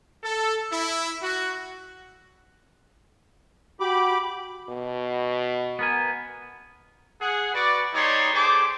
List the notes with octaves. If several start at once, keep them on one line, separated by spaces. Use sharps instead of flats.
A4
E4
F#4
F#4 G4 B5 D6
B2
B3 A#4 G#5
G#4 F#5
F#4 B4 D5
G3 D#4 C#5 D5 C6
G3 G#4 A4 C5 D6